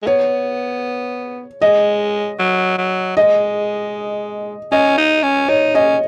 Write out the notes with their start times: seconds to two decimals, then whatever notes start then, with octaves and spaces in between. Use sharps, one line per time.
0.02 G#3
0.07 B3 C#5
1.62 G#3 D#5
2.39 F#3
2.78 F#3
3.17 G#3 D#5
4.72 C#4 D#5
4.98 D#4
5.23 C#4
5.49 D#4 C#5
5.75 C#4 D#5